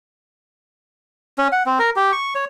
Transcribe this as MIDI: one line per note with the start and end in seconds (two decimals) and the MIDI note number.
1.38 1.48 61
1.52 1.63 78
1.66 1.79 60
1.79 1.90 70
1.96 2.12 67
2.12 2.34 85
2.35 2.45 73